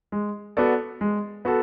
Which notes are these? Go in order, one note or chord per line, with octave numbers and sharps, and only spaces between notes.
G#3
B3 F#4 A4 D5
G#3
B3 F#4 A4